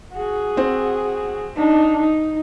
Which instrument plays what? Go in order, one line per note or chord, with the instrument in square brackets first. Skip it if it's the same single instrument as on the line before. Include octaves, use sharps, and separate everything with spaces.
[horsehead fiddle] F#4 G#4
[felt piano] C4
[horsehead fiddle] D4 D#4
D#4